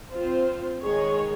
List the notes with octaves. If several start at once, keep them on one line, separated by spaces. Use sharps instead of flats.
C4 F4 C5
D#3 G#3 D#4 G#4 C#5